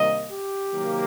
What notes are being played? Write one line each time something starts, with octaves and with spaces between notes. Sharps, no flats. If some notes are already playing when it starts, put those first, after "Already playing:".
Already playing: C3 D#3 G3 A#3 D#5
G4
C3 D#3 F#3 A#3